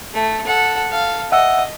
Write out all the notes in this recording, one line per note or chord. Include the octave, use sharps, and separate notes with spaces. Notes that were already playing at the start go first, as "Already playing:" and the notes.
A3
A4 F#5
A4 F5
D#5 E5 F#5 E6